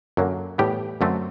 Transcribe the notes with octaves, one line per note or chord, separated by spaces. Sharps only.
F#2 D3 F#3 A#3
A2 E3 G3 B3 G4
F#2 D3 F#3 A3 C4